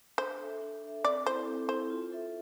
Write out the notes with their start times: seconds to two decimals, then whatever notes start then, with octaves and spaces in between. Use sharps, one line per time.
0.18 D4 C5
0.40 A4 E5
0.61 D4
0.83 A4 E5
1.04 C4 D5
1.26 E4 A4 C5
1.47 C4
1.69 E4 A4 C5
1.90 F4
2.12 A4 E5